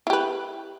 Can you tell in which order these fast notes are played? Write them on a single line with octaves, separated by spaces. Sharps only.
E4 G4 B4